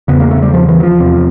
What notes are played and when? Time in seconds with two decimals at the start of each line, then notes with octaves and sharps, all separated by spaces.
0.08 E2 C#3 B3
0.20 A#3
0.31 A3
0.42 G3
0.53 F3
0.69 E3
0.80 F#3
0.83 F3
0.99 E2 C3